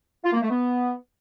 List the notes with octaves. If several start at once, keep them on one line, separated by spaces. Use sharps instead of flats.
F4
A#3
A3
B3